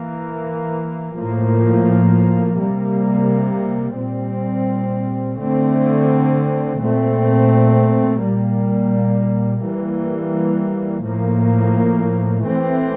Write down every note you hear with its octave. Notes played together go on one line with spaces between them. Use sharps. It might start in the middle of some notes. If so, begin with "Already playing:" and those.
Already playing: E3 A#3
A2 F3 A#3
C3 G3 A#3
A#2 G3 C4
D3 A3 C4
A#2 A3 C4
A#2 G3 A#3
E3 G3 A#3
A2 F3 A#3
E3 A3 C4